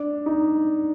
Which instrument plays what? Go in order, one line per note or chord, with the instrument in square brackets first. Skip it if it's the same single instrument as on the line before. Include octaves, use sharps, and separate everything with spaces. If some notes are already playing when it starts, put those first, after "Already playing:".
Already playing: [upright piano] D4
D#4